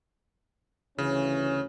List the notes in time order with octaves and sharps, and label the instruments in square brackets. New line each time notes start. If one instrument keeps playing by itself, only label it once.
[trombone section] D2 E3 C#4 [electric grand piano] C#3